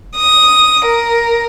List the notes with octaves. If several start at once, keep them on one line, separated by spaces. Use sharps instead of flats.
D#6
A#4